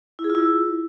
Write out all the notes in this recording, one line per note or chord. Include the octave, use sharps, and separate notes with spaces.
E4
G#4
F4
E4